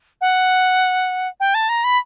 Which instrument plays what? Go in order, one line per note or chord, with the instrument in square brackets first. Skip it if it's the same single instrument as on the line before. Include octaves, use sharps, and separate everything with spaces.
[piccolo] F#5
G5
A5
A#5
B5